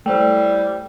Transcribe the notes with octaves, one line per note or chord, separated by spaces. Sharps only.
A2 G3 A3 C5 G5